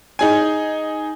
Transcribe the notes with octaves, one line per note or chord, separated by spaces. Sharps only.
D#4 G#4 G#5